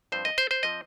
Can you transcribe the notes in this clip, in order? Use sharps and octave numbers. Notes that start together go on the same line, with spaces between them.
G2 F3 C4 C5
D#5
C5
C5
F3 C4 D#5